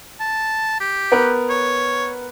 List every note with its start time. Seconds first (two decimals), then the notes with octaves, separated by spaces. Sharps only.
0.20 A5
0.80 G4
1.12 B3 A#4 B4
1.50 C#5